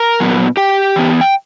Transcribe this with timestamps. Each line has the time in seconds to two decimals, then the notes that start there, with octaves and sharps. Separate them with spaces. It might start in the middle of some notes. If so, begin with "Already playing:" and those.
Already playing: A#4 A#5
0.20 A#2 F#3 B3
0.57 G4 G5
0.96 E3 B3
1.21 G5